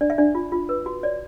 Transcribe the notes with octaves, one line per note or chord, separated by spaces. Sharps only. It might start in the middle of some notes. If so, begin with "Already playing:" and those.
D4 D5
E5
D4 D5
F4
F4
B4
F#4
C#5 D5